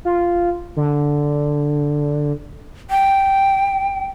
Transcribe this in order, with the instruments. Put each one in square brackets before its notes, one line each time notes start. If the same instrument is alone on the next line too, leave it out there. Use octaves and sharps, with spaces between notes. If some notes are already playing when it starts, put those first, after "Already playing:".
[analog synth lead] F4
D3
[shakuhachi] G5